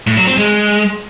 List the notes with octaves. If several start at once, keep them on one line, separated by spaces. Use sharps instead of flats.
A2
F#3
C4
G#3